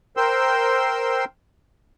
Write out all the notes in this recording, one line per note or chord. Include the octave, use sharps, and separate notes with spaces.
A#4 C5 G5 C6 E6